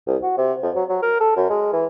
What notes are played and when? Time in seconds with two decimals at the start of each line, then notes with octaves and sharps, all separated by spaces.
0.07 C2
0.23 F#4
0.38 C3
0.63 F2
0.75 F#3
0.89 F#3
1.02 A#4
1.20 A4
1.36 F#2
1.50 G#3
1.73 E3